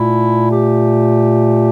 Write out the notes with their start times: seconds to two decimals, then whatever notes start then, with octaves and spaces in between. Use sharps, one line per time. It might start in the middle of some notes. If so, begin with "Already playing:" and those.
Already playing: A#2 A3 E4
0.51 G4